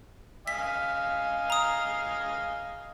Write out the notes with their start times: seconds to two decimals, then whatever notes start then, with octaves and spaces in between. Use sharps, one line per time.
0.47 D#5 F5 G#5 B6
1.50 A#5 D#6